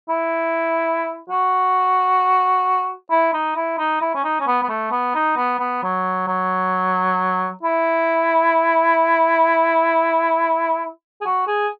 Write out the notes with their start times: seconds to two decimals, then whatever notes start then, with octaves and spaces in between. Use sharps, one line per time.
0.09 E4
1.30 F#4
3.11 E4
3.34 D#4
3.56 E4
3.78 D#4
4.01 E4
4.15 C#4
4.24 D#4
4.41 C#4
4.47 B3
4.63 B3
4.69 A3
4.91 B3
5.15 D#4
5.37 B3
5.59 B3
5.83 F#3
6.28 F#3
7.63 E4
11.21 G#4
11.26 F#4
11.47 G#4